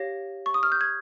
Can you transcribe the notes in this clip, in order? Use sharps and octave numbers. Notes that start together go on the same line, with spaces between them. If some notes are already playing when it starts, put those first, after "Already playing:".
Already playing: G4 C#5 F5 A#6
C#6
D#6
F6
G6
G#6